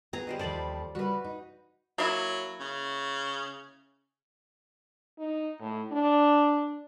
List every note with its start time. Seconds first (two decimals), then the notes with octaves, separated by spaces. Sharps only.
0.13 B3 G#4 A#5
0.27 G3 C5 D#5
0.39 D#2 F3 A4 C5 D5 B5
0.95 C#3 G3 F#4 B4
1.24 D#4
1.98 F#3 A#3 E4
2.60 C#3
5.19 D#4
5.60 A2
5.92 D4